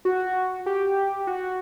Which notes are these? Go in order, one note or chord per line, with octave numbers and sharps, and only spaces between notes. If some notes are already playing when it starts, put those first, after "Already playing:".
F#4
G4
F#4